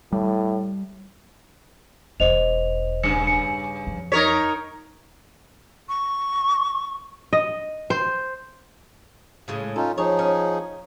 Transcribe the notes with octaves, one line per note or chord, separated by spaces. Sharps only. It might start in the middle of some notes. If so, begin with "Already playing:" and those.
A2 G3
E1 E2 C5 D#5 F7
G2 C#3 C#7
C#7
F2
D#4 A#4 C#5 B6
C#6
D#5
C5
A2 C#3 G#3
C#4 D#4 F4 A4
F3 D#4 G#4 C#5
C#4